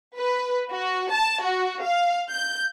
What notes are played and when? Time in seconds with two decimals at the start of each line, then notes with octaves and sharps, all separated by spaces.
0.16 B4
0.72 F#4
1.12 A5
1.44 F#4
1.84 F5
2.31 G6